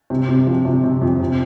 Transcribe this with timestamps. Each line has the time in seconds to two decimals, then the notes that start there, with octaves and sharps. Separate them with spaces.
0.10 C3
0.29 C3
0.47 F3
0.65 C3
0.84 C3
1.02 F2
1.20 C3